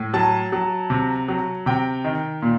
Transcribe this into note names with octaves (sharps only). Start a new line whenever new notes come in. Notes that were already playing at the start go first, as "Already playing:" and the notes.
Already playing: A2
F#3 A5
F#3
C3
F#3
C3 G5
D#3
A#2